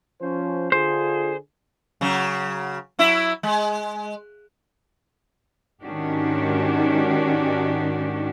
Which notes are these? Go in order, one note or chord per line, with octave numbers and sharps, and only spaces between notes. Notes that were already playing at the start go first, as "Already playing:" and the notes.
F3 C#4 C5
D3 F4 G#4 C5
C#3 F#3
F#3 E4 E5
G#3
G#2 D#3 C#4 D4 F#4 G4